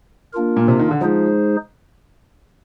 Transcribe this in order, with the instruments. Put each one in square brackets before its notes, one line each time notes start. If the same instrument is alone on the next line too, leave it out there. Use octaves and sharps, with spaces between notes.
[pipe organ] A#3 D4 F4 A#4
[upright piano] A#2
C3
D#3
D3
[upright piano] F3 [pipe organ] G#3 D#4 G#4 C5